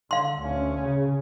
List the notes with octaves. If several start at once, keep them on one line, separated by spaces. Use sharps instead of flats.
D3 F5 C6
D2 C#4
C#3